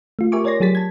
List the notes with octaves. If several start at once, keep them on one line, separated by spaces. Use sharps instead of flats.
A3 F4
G4 A#4 E5 G#5 C#6 D6
A#4 C#5 D5 G#5 C6 A#6
F#3 G4 G#4 A6 B6
A5 G#6